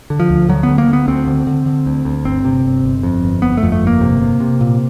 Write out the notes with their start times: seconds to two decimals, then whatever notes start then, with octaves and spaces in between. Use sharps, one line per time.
0.10 D3
0.20 F3
0.30 D2
0.49 D3 F#3
0.63 B3
0.69 D2
0.78 A#3
0.88 D3 B3
1.08 D2 C4
1.27 D3
1.47 D3
1.66 D3
1.86 D2
2.05 D2
2.25 G1 C4
2.45 C3
2.65 G1
2.84 G1
3.03 F2
3.23 G1
3.42 G1 B3
3.57 A3
3.63 F2
3.72 A3
3.82 G1
3.87 A#3
4.01 C3
4.21 C3
4.40 C3
4.61 A#2